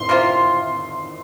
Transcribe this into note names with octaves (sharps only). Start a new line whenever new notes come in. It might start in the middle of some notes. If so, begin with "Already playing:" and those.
Already playing: C6
C3 G3 F4 C5